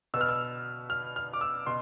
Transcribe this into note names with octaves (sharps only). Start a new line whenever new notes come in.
B2 B3 E6 F6
E6
F6
F6
D6
E6
B2 C6